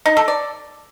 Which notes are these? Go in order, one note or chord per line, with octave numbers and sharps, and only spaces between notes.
D#4
A4
D5